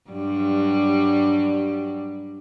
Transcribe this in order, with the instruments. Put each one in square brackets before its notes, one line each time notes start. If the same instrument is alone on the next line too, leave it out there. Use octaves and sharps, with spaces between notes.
[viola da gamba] G2 F#3 G3